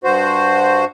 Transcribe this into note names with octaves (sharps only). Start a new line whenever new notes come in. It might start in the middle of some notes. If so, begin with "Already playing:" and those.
G2 F#4 C5